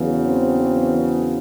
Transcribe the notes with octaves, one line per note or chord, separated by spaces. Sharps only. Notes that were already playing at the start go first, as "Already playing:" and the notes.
Already playing: E2 C#3 F#3
C4